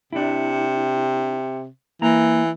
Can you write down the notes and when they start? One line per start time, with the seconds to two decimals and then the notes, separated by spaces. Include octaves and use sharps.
0.13 C3 D4 E4
2.02 E3 A#3 A#5